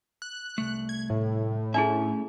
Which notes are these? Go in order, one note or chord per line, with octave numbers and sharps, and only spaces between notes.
F#6
C2 A3
G#6
A2
A3 C#4 D4 E4 G#4 E5